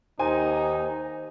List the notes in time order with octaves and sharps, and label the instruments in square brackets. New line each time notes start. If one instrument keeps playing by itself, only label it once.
[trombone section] D#2 [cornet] D#4 [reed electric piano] C5 [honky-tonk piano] G#5